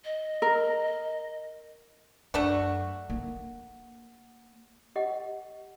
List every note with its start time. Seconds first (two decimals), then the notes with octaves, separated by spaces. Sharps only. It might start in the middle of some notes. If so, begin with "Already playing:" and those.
0.05 D#5
0.42 A#4
2.34 F#2 A3 D4 F#4
3.10 A#3
4.96 G4 D#5 F#5